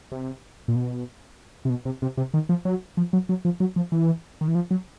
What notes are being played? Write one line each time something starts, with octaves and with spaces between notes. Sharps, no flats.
C3
A#2
B2
C3
B2
C3
C3
C3
D#3
F3
F#3
F3
F#3
F#3
F3
F#3
F3
E3
D#3
E3
F3
F#3